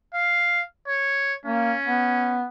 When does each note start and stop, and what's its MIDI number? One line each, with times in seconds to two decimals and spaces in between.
0.14 0.62 77
0.88 1.34 73
1.46 1.73 58
1.46 2.44 61
1.86 2.45 59